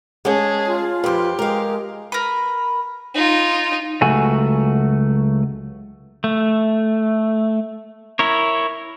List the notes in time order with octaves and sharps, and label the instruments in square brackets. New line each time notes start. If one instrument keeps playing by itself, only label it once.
[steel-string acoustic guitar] G#3 C#4 [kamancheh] G#4 A5
[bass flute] F4
[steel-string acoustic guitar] F2 B4 [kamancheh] G4
[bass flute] G#3 [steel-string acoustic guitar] A#4 F5
[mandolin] A#4 B4
[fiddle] D#4 F4
[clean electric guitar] C#2 F#3 A3 F#4 G#5
[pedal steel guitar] A3
E4 A#4 C#5